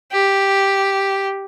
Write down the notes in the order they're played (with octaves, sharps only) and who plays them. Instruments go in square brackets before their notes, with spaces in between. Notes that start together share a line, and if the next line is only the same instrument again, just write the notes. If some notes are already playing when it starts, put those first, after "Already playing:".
[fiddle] G4